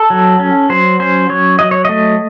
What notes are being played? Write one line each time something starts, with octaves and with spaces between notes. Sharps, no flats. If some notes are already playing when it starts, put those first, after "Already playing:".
Already playing: A4
F#3
C#4
F#3 C5
C#4 C5
F#3 C#5
F#3 D#5
C#5
A3 D#5